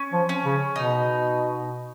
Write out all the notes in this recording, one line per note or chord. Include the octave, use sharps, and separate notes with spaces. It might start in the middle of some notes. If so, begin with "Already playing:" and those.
Already playing: C#4
F3
C#4
C#3
B2 D#4